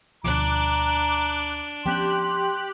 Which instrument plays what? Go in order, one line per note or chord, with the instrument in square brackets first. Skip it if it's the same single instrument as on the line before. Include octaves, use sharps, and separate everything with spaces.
[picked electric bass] D2 B2 F3 [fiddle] D4 [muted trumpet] A#5 [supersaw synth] D6 F#6
[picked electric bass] F3 B3 C#4 [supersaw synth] G4 F#6 [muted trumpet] C6